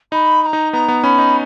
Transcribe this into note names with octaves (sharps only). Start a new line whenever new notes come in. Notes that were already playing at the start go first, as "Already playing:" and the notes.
D#4 B5
B5
A#5
D#4
B3 A#5
B3
C#4 B5
D#4